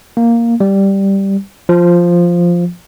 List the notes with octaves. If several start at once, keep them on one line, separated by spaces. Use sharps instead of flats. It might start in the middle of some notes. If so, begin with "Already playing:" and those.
A#3
G3
F3